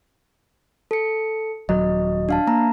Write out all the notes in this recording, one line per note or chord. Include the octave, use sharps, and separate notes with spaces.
A4 C#7
D#1 F#3 D#5
D4 F5 A5
A#3 A#5